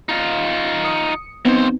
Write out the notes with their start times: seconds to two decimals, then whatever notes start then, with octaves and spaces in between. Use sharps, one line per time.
0.09 D#4 F4
0.85 D#6 C#7
1.45 D#2 B3 C4 D#4 C5